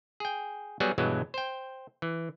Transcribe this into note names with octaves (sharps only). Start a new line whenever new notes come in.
G#4 G5
F#3 G3 B3 F#4 G#4
G2 B2 E3 F#3 G#3
C5 G5
E3